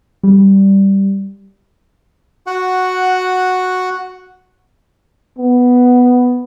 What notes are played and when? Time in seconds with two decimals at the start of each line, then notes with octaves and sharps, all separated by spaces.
0.23 G3
2.47 F#4 F#5
5.38 B3